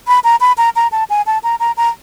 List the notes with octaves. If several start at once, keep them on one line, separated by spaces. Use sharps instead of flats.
B5
A#5
B5
A#5
A#5
A5
G#5
A5
A#5
A#5
A#5